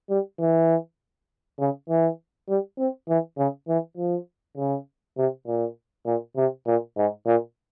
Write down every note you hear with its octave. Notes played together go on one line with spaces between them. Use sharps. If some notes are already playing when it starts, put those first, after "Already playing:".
G3
E3
C#3
E3
G3
C4
E3
C#3
E3
F3
C#3
C3
A#2
A#2
C3
A#2
G#2
A#2